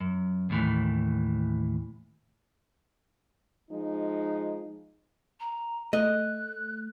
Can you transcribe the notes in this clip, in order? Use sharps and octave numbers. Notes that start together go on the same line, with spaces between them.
F#2
D#2 A2 E3
F3 G#3 D#4
A#5
A3 D#5 F#6